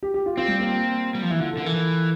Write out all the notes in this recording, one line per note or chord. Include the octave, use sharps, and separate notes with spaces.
G4
G4
F4
C4 F4
G3
A#3
G3
F3
E3 E4
D3 F4
A4
D3
E3 A#4
E3